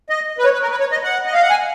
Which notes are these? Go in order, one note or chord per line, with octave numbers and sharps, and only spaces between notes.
D#5
B4
C#5
B4
A#4
B4
C#5
D#5
F#5
D#5
F5
F#5
G#5